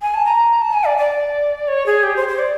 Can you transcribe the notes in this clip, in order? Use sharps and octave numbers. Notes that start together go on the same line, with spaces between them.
G#5
A5
A#5
A5
G#5
D5
D5
C#5
G#4
G4
C5
C5
D5